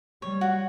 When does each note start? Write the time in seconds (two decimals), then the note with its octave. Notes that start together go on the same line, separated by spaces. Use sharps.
0.22 G3 C#5
0.41 F#4